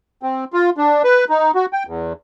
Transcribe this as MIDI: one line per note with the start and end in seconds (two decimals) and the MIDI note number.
0.23 0.44 60
0.53 0.70 65
0.77 1.02 62
1.04 1.25 71
1.29 1.51 63
1.55 1.66 66
1.73 1.83 79
1.87 2.13 40